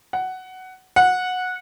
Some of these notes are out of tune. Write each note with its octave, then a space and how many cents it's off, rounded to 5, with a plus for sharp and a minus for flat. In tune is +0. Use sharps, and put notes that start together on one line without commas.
F#5 +10
F#5 -15